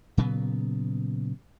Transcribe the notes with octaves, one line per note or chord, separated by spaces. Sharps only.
A#2 C#3 F#3 B3